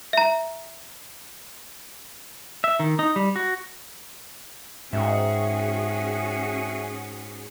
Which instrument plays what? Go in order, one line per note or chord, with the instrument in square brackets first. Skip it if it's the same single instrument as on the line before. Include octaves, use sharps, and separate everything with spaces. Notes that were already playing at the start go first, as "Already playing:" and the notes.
[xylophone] E5 A#5
[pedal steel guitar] E5
D#3
D#4
G3
F#4
[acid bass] G#2 [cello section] C#4 F#4 G#4 [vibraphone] E5 G5